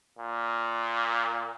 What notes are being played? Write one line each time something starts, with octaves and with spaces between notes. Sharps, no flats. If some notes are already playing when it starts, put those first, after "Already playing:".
A#2